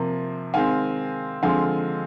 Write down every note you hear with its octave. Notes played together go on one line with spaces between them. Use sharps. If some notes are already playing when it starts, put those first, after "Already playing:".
Already playing: C3 F3 A#3
D#3 G#3 C4 F5 G#5
D3 F3 G#3 C4 F5 G#5